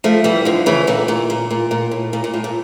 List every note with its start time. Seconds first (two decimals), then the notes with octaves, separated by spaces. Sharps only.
0.04 F3 A3
0.24 E3 G3
0.45 D3 F3
0.66 C#3 E3
0.87 A#2 D3
1.08 A#2
1.30 A#2
1.51 A#2
1.71 A#2
1.91 A2
2.13 A#2
2.24 A#2
2.34 A2
2.44 A#2